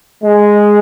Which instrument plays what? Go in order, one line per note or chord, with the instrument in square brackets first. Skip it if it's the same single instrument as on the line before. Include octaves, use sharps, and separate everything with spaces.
[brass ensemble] G#3